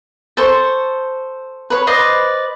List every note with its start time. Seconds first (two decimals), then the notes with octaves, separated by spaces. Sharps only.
0.37 A4 C5 C#6
1.70 B4 C#5
1.87 B4 C5 D5 D#5